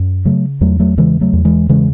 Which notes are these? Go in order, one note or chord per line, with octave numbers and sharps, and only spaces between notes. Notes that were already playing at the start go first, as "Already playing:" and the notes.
Already playing: F#2
C#3 F#3 A3
E2 F#3 A3
F#3 A3
C#3 E3 G#3
F#3 A3
E2
E3 G#3
C#3 E3 G#3